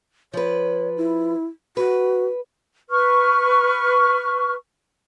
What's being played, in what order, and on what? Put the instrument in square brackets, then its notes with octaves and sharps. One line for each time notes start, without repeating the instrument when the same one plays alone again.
[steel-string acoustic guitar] F3 B4 [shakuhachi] C#5
[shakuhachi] E4
[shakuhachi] F#4 [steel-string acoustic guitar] B4
[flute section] B4 C#6 F6